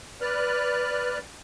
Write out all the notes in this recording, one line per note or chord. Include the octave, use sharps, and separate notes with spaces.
B4 D5 F6 F#6